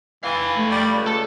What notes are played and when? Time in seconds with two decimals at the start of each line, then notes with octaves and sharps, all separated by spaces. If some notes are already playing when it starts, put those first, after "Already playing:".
0.23 E3 G4 F5
0.56 A3
0.71 G3
0.94 C#2
1.06 A4